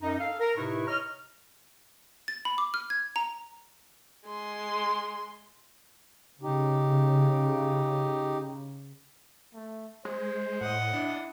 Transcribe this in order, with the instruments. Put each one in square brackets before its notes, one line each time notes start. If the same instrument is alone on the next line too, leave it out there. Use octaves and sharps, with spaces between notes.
[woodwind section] F#2 D#4
A4 F5
A#4
A2 C3 D#4 E4 B4 C#6
C#5 D#5 A#5 F6
[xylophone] A6
B5
D6
F6
G#6
A#5
[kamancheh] G#3 C6
[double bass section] C#3 [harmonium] D#4 G4
[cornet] A3
[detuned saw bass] G#3 [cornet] C5
[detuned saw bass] A2 [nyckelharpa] D#5 F#5
[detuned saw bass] D4 [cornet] E4